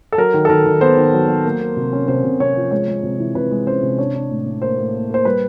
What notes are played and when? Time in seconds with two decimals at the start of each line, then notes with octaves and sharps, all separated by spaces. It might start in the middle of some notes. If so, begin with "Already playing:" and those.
0.12 A4
0.18 F#3 A#4
0.34 D#3
0.45 A4
0.49 D#3 A#4
0.66 D#3
0.81 B3 C5
0.97 D#3
1.13 F#3
1.29 F#3
1.45 A#3
1.60 A#3
1.77 C3
1.93 C#4
2.08 C3 C5
2.24 C3
2.40 C3 C#5
2.56 F3
2.71 G#3 C#5
2.88 G#3
3.03 C3
3.19 E3
3.35 C3 B4
3.51 G#3
3.67 C#4 C5
3.83 C3
3.98 D4 C#5
4.15 D4
4.31 A2
4.46 A2
4.62 A#3 C5
4.78 A2
4.94 A#3
5.10 A#3 C5
5.25 G3 B4